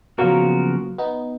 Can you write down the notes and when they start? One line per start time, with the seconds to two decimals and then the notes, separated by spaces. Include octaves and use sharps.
0.18 C#3 F3 F#3 A#3 B3 F#4 A#4
0.98 B3 D#4